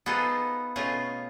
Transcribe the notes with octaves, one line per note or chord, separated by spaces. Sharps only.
B3 D#4 F4 G#4 A4 C5
B2 A3 C#4 F4 G#4